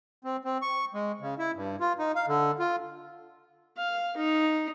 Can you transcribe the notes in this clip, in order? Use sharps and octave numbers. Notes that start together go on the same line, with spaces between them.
C4
C4
C#6
G#3
C#3
E4
G2
F4
D#4
F5
D3
F4
F5
D#4